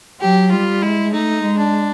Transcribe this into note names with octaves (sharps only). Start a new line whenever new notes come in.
F#3 G4
G3 F4
G#3 E4
A3 D#4
G#3
D4